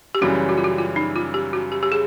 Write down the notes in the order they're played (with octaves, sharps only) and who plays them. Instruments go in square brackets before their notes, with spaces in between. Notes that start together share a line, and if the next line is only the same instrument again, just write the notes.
[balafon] G4
[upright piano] F#2 C#3 E3 G3 [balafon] F#4
[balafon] F#4
F4
F#4
F4
D#4
F4
G4
F#4
G4
G4
G#4